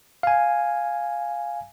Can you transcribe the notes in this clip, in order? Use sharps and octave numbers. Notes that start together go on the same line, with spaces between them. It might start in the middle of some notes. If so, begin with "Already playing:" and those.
F5 G#5